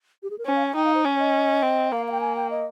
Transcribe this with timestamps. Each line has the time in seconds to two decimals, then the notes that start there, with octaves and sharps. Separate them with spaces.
0.23 G4
0.30 G#4
0.38 A#4
0.46 C#4 C5
0.55 F5
0.65 G#5
0.75 D#4 G5
0.85 F5
0.94 C5
1.04 C#4 C#5
1.19 D#5
1.62 C4
1.92 A#3 F5
2.08 F5
2.12 G5
2.21 G#5
2.36 G5
2.50 D#5